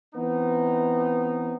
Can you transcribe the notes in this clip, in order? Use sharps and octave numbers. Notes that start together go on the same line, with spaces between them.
E3 B3 C4 D#4